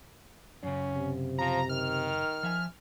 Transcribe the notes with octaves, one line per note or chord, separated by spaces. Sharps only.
F#2 C#3 C#4
C3
F3 A#5
D#3 F6
F3 E5 G#5